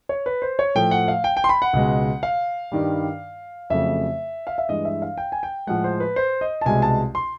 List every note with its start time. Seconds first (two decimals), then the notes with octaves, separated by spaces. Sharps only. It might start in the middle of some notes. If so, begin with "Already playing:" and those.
0.09 C#5
0.26 B4
0.42 C5
0.59 C#5
0.75 A2 F3 A3 G5
0.91 F#5
1.08 F5
1.24 G5
1.37 G5
1.44 C6
1.49 B5
1.62 F#5
1.73 C#2 B2 G#3
2.23 F5
2.72 G2 D#3 G3
3.70 F2 C#3 F#3 A3 E5
4.47 F5
4.58 E5
4.69 G2 E3 G#3 D#5
4.85 E5
5.02 F5
5.18 G5
5.32 G#5
5.43 G5
5.67 A2 F3 G#3 F#5
5.84 C5
6.00 B4
6.16 C5
6.41 D#5
6.61 A5
6.66 C2 B2 G#3 G#5
6.82 A5
7.15 C6